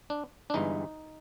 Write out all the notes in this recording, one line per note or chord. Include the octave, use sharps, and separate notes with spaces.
D4
D4
G1 G2 E3 G#3 D#4